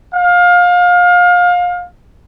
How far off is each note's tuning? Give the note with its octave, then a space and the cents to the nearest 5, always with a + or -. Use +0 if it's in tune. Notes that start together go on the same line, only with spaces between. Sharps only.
F5 +25